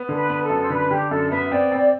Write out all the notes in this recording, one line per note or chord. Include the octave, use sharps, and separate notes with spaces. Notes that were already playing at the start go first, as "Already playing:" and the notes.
Already playing: B3
D3 A4
B4
B3
A4
F#2
D5
C5
D3 B4
D3 G4
F#2 A4
B3 E5
C4 D5
C4